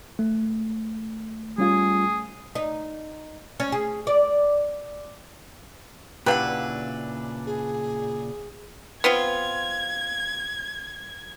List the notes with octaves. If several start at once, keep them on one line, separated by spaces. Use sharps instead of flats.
A3
G3 C#4 F4 G#4
D#4
C#4
G#4
D5
A#2 C#3 D4 E4 G4 B4 F5 F#5
G#4
B3 C4 F4 G#6